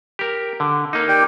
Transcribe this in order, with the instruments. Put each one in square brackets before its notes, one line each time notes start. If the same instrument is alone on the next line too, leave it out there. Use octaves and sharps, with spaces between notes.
[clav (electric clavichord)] G4 A#4
D3
A#3 D#4
[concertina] G4 D5 G5